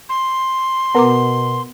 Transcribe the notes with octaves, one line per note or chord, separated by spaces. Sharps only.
C6
B2 B3 A#4 B4 F#5 A#5 D6